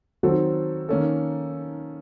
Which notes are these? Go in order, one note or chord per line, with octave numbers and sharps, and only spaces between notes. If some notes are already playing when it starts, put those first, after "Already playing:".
D#3 F#3 C4 F#4 A4
D#3 A#3 C#4 A4